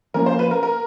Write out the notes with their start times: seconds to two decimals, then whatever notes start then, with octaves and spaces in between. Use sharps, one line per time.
0.14 F3 A#3 C#4 A#4
0.26 C5
0.39 B4
0.51 A#4
0.63 A#4